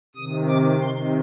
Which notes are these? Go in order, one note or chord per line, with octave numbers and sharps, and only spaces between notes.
C3 D#3 D#6
D6
C3 D#3 C6